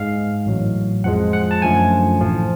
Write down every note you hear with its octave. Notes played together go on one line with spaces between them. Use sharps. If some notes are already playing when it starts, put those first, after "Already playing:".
Already playing: G#2 G#3 F5
A1 A2 F#3
F2 F3 G#3 F#5
F#5
A5
F#2 D3 F3 A3 G#5
A1 A2 F3